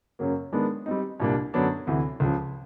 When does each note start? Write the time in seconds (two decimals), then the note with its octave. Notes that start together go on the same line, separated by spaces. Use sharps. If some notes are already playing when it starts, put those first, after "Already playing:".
0.19 F#2 C#3 F#3 A#3
0.53 D#3 G#3 B3 D4
0.86 G3 C4 D#4
1.20 C2 A#2 G3 A#3 D4
1.54 F#2 D3 F#3 B3 D4
1.87 D2 C3 E3
2.20 C#2 C#3 F3